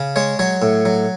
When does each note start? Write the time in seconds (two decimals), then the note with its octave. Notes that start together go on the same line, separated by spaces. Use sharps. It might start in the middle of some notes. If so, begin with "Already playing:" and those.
Already playing: C#3
0.16 G#3 C#5
0.39 F#3 C#5
0.62 A2
0.85 F#3